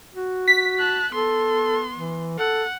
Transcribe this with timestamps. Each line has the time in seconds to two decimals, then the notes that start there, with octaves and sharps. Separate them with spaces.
0.14 F#4
0.48 B6
0.79 A5 F#6
1.13 B3 A4 C6
1.96 E3
2.38 A4 F#5